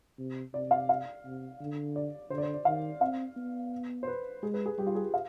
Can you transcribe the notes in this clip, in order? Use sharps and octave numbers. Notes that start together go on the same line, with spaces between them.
C3
C3 D5
F5
F5
C3
D3
D5
D3 C5
D5
C5
D5
D#3 F5
C4 F5
B3
C5
B4
G#3 G#4
B4
G#4
G3 G4
F4
G#4
F5